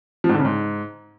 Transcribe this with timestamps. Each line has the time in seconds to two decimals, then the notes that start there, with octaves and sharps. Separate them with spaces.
0.24 F3
0.29 G#2
0.34 D3
0.40 C#3
0.45 G#2